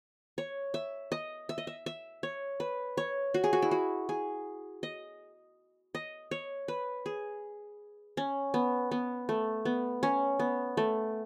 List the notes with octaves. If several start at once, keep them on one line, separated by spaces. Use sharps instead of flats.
C#5
E5
D#5
E5
D#5
E5
E5
C#5
B4
C#5
F#4
G#4
F#4
E4
F#4
G#4
D#5
D#5
C#5
B4
G#4
C#4
B3
B3
A3
B3
C#4
B3
A3